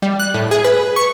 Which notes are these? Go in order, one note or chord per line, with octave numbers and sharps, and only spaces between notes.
G3
F#6
A2
G#4
B4
C#6